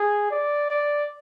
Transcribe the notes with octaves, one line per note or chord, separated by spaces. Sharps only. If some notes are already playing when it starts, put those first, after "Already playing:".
Already playing: G#4
D5
D5